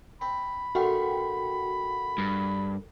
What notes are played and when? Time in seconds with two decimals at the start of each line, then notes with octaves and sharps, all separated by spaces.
0.21 C4 B5
0.75 A#1 A3 F#4 F#5 G5
2.18 G2